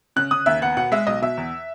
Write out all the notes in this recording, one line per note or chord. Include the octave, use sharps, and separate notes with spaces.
C#3 F#6
C#3 D#6
D#2 E5
B3 F#5
B2 F#5
G#3 E5
B1 D#5
B2 E5
E2